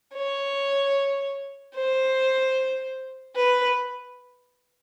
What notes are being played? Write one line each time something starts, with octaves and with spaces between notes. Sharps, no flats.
C#5
C5
B4